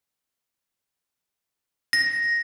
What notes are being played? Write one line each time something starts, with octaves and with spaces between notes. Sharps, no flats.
A#6